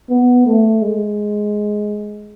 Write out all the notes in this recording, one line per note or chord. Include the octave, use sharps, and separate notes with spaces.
B3
A3
G#3